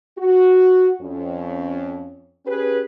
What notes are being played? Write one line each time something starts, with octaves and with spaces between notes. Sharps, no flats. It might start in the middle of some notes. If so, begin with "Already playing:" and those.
F#4
F2 C#4
C#4 G4 G#4 B4